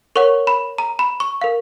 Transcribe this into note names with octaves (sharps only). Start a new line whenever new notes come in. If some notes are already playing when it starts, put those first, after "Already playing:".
A#4 C#5 F#5 C#6
B5
A#5
B5
C#6
A#4 F5